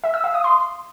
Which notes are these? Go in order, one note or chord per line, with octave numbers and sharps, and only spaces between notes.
E5
E6
F5
D#6
C6